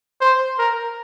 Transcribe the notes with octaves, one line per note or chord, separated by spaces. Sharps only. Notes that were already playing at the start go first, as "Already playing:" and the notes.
C5
A#4